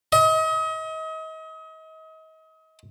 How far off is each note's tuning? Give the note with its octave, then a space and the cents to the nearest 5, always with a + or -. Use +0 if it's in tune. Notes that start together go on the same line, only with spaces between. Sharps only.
D#5 +35